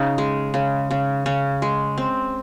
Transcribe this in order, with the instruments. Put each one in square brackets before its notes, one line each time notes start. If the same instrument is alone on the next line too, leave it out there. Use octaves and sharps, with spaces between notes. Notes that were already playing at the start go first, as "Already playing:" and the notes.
Already playing: [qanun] C#3 D#4
G#3
C#3
C#3
C#3 C#4
G#3
C4